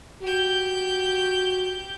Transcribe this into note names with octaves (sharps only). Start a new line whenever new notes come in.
F#4 G4 G6